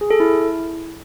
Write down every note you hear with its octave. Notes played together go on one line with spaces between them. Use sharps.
G#4
A4
E4